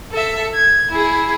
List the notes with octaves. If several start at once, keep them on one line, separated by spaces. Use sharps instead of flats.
A4 E5
G#6
E4 G#4